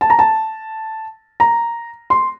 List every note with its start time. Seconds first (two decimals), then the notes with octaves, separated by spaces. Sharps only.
0.01 A5
0.10 A#5
0.19 A5
1.40 A#5
2.10 C6